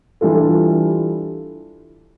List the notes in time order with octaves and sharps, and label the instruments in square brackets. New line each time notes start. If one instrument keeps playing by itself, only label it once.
[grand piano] E3 G3 D4 F4 A4